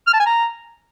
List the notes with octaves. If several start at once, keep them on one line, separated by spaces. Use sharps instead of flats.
F6
A5
G#5
A#5